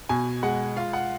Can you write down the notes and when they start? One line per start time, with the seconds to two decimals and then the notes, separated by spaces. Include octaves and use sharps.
0.09 B2 G#5
0.43 G#3 F#5
0.76 F4 F5
0.93 F#5